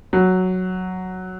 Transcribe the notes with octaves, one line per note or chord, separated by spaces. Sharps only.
F#3